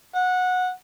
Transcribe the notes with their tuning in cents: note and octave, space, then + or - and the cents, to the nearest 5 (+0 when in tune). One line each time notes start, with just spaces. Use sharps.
F#5 -15